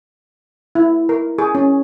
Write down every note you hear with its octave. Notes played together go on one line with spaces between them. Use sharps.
E4
A#4
G#4
C#4